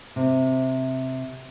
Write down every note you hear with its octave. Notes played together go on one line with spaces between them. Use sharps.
C3